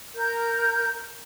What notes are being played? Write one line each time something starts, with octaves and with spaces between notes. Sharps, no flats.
A#4 G6